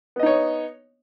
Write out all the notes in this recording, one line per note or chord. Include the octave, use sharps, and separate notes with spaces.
B3 D#4 C#5 D#5